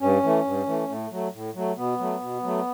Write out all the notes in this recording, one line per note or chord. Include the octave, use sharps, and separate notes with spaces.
G2 C#4
E3 A3
G2
E3 A3
A2 A3
F#3 A3
A2
F#3 A3
B2 B3
F#3 A3
B2
F#3 A3